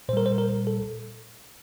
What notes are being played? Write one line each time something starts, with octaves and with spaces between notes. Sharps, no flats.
A#2 G3 A#4 C5
C5
A#4
A4